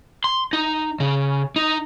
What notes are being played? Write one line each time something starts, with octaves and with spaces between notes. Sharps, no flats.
C6
D#4
C#3
D#4